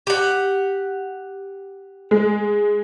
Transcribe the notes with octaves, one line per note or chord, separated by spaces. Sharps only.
G4 F#5
G#3